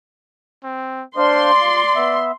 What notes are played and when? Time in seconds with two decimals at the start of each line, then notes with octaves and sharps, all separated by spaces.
0.64 C4
1.17 D4 C5 D5 F5 C6
1.60 F4
1.95 B3 E5